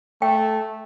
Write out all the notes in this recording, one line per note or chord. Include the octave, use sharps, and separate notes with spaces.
A3 G5